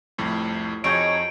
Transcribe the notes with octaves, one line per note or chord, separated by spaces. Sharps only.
C2 F2 A2
F2 D#4 F#4 G#4 C#5 G6 D7